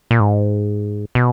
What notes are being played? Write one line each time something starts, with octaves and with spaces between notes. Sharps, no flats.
A#2
G#2
B2